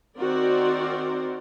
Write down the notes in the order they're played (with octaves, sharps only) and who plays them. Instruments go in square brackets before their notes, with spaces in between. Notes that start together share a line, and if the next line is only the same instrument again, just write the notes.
[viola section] D#3 C4 F#4 A#4 C5 D5